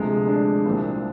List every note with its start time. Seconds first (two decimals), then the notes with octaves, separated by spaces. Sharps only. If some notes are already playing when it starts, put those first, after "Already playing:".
Already playing: D2 C3 F3 G#3
0.27 D4
0.65 C2 A#2 F3